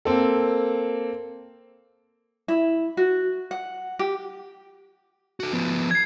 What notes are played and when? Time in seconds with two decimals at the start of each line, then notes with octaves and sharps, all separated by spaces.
0.05 A#3 C4 A4
2.48 E4
2.97 F#4
3.51 F#5
3.99 G4
5.40 F#4 A4
5.52 F3 B3
5.91 G#6 C7